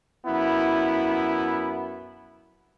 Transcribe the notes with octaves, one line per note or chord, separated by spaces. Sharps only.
F#2 B3 E4